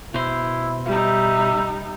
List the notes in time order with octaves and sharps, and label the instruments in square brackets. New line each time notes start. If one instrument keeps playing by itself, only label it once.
[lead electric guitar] B2 C5 [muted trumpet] E4
[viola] G3 D#4 [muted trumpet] E5